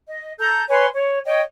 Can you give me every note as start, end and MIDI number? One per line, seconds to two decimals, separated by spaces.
0.07 0.32 75
0.39 0.62 69
0.39 0.62 82
0.39 0.62 91
0.69 0.86 71
0.69 0.86 73
0.69 0.86 80
0.69 0.86 84
0.94 1.19 73
1.25 1.40 73
1.25 1.40 75
1.25 1.40 79